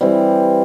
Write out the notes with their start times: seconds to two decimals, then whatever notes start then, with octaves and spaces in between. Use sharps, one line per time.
0.01 E3 G3 C4